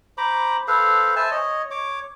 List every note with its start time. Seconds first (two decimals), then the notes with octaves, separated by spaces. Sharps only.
0.18 C5 A#5 B5 D6
0.68 A4 B4 C5 F5
1.16 C5 E5 G#5 A5
1.31 C#5 D#5
1.71 C#5 D6